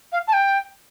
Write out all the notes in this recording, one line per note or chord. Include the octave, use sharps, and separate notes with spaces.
F5
A5
G5